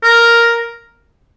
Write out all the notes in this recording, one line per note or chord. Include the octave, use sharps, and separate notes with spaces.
A#4